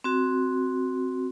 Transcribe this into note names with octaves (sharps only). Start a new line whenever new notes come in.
C4 F#4